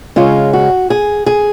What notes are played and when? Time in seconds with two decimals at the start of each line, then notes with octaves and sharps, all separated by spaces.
0.16 C#3 G#3 C#4 F4
0.53 F#4
0.90 G#4
1.26 G#4